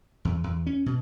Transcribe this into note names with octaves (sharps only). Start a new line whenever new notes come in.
E2
E2
C#4
B2